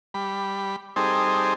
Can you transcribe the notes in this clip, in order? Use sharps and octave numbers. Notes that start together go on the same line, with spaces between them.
G3 B5
G3 C4 D#4 G#4 A4 C5